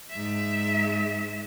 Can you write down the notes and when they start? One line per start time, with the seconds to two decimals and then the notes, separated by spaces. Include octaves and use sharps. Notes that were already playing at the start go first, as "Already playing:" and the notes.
0.11 G#2 E5